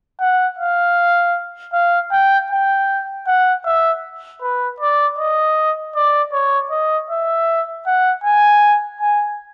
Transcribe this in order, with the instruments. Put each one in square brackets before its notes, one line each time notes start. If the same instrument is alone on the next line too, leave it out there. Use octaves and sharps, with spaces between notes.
[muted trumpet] F#5
F5
F5
G5
G5
F#5
E5
B4
D5
D#5
D5
C#5
D#5
E5
F#5
G#5
G#5